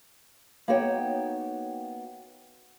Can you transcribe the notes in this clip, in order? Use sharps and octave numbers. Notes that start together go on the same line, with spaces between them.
A#3 B3 D#4 F#4 C#5 G5